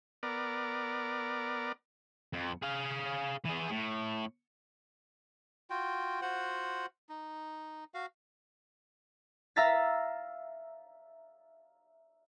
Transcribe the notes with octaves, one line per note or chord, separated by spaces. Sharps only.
B3 A#4 D5
F2
G#4 F5
E3 G#4
A2
F4 F#4 G5
F4 F#4 C5 F#5
D#4
F#4 F5
E5 F5 A#5 E6 A6 B6